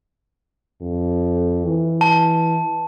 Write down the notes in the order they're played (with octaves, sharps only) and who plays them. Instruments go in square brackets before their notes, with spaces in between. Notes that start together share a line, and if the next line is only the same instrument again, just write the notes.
[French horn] F2
E3
[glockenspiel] A5